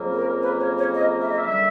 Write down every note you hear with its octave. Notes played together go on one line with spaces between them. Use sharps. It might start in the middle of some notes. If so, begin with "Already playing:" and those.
Already playing: F2 C#3 F#3 A#3
A4
A#4
B4
C#5
C#5
D#5
E5
D#5
E5
D3 G3 A#3 E5